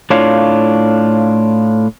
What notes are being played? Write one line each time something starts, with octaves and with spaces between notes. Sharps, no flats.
A2 D4 F4 C#5 F5